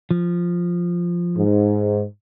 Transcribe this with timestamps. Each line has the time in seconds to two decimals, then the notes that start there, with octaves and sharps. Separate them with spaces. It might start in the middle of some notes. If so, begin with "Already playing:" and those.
0.11 F3
1.37 G#2